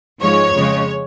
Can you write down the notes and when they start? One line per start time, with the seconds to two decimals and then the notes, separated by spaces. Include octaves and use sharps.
0.21 G#2 F3 G#3 C#5
0.54 F2 C#3 G#3